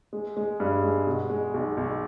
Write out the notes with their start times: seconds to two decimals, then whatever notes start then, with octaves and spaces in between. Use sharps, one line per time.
0.13 G#3
0.37 G#3
0.60 G2
0.83 G#3
1.07 B2
1.30 G#3
1.54 B1
1.77 B1